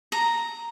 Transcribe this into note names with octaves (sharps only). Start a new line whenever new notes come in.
A#5